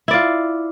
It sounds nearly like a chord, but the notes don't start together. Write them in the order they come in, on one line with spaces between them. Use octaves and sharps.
E4 D5 F4